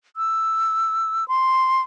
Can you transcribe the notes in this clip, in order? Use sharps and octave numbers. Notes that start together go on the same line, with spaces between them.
E6
C6